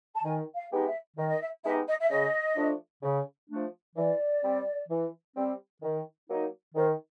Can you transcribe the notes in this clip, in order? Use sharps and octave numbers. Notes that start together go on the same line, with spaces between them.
A5
D#3 G#5
F5
G#3 B3 D#4 G4
E5
D#3 D#5
D#5
E5
G#3 B3 D#4 G4 E5
D#5
E5
C#3 D#5
F3 A3 D4
C#3
F3 A3 D4
E3 D5
G3 C4
E3
G3 C4
D#3
F#3 A#3 D#4
D#3 C5